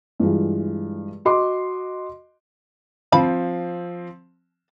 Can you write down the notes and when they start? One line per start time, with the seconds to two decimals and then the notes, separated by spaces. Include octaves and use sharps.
0.20 G2 E3 G#3 F4
1.25 F#4 D#5 C6 D6
3.12 F3 C4 F5 A5 B5